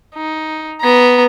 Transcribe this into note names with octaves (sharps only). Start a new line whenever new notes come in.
D#4
B3 A#5